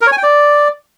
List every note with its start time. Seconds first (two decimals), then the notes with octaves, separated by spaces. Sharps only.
0.01 A#4
0.07 C#5
0.12 G#5
0.18 G5
0.23 D5